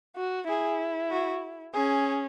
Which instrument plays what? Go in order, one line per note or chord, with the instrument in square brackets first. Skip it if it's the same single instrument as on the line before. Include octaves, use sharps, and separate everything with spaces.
[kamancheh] F#4
[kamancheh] E4 [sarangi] G#4
[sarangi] F#4
[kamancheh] C#4 [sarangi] G#4